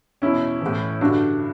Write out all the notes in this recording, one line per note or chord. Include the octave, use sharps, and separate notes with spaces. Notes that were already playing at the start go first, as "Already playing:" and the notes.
E2 B2 C#4 E4
E3
A2
G2 D3 D4 F#4